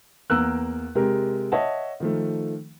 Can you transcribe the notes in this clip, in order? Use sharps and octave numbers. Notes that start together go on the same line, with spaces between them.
E2 A#3 A#4 E6 F#6
C3 G#3 G4 A#4
C#5 D#5 E5 F#5 A5
D#3 F3 A3